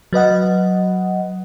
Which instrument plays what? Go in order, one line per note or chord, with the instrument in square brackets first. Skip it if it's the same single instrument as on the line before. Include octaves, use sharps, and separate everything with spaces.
[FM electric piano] F#3 B4 D#5 F#5